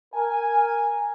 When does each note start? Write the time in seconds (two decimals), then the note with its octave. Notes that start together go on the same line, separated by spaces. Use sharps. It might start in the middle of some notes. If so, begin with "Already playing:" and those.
0.14 A#4 G#5